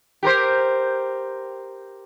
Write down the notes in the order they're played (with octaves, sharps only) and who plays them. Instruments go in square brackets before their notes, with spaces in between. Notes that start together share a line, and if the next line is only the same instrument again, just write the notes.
[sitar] G4 A#4 C5